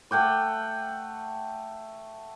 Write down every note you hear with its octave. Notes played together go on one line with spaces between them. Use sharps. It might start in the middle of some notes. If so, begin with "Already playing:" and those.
A3 F#5 G5 D6